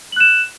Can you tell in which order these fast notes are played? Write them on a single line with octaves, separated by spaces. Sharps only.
F#7 F#6 E7